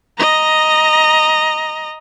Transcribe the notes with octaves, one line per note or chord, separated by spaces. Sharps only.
D#5 A#5